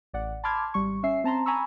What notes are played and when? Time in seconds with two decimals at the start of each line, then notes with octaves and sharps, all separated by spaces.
0.13 A1 D5 F#5
0.44 A5 B5 C6 D6 F6 G#6
0.74 G#1 G3 C#6
1.03 C#4 E5 C7
1.24 C4 A5 A#5 C6
1.46 G#5 A#5 B5 C#6 E6